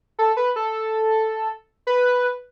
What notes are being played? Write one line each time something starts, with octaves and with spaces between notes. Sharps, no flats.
A4
B4
A4
B4